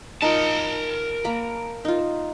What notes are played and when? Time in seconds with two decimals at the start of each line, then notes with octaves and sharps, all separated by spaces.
0.22 D#4 F4 A#4 A5
1.25 A#3 B5
1.85 D#4 F4